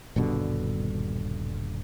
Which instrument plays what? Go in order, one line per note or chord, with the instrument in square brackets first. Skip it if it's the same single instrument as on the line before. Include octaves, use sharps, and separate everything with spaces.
[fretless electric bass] D#1 G2 B2 D3